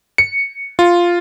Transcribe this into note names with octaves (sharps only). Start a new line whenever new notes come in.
C#7
F4